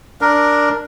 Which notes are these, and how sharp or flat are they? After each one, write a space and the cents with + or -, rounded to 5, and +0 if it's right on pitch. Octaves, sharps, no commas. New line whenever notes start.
D4 +0 A#4 +0